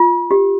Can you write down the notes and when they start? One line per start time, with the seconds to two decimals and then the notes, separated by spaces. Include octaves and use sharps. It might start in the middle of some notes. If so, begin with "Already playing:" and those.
Already playing: F4
0.31 G4